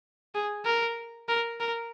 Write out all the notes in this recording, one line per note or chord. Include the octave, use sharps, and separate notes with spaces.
G#4
A#4
A#4
A#4